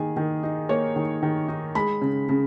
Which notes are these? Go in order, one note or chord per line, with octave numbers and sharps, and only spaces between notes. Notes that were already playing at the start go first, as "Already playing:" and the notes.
Already playing: D#3 A#3 G#4
D#3
D#4
A#3 C#5
D#3
D#3
D#4
G#3 B5
C#3
C#3